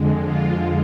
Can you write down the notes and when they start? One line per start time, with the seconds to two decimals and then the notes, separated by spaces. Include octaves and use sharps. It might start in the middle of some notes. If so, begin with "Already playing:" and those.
Already playing: F2 D3 G#3
0.23 F4